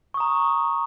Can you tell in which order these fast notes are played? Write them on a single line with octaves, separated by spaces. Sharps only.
C#6 D#6 A#5